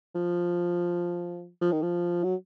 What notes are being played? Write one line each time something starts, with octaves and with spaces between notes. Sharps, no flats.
F3
F3
D#3
F3
F#3